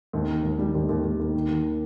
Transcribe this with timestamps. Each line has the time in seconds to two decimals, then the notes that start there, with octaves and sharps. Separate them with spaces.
0.13 D#2
0.28 D#3
0.43 D#2
0.58 G3
0.74 D#2
0.89 D#2
1.04 D#2
1.20 D#2
1.35 D#3
1.49 D#3